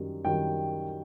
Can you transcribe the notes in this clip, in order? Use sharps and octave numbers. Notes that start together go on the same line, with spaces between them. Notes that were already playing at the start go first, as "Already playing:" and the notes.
Already playing: F#2 D#3 G3
F#2 D#3 G3 G5